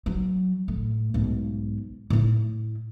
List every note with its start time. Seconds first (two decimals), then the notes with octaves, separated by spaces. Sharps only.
0.06 F#3
0.68 A2
1.14 B1 G#2
2.10 A2 E4